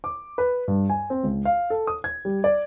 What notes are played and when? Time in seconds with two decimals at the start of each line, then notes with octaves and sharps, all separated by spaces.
0.04 D6
0.38 B4
0.68 G2
0.89 G#5
1.10 C4
1.23 C#2
1.45 F5
1.70 A4
1.87 D#6
2.04 G#6
2.25 G3
2.44 D5